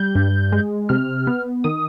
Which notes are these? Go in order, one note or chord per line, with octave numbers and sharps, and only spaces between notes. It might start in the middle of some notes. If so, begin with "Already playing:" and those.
Already playing: G3 G6
G2
G#3
C3 F6
B3
D#3 D#6